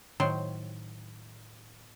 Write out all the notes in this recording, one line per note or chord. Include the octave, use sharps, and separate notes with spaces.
A2 D#3 F#3 C5